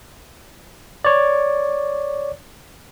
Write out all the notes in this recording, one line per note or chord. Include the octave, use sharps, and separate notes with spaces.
C#5 D5